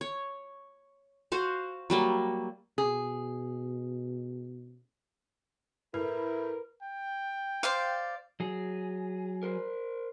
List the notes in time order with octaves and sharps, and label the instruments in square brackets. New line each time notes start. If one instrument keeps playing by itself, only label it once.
[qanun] C#5
F#4 C5 F5
F#3 G3 A#3
[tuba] B2 [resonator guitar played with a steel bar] G#4
[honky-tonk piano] A2 [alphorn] E4 [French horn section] A#4 [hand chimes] B4
[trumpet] G5
[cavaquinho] C5 D5 F5
[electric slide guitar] F#3 G#4
[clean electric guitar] A#4 C5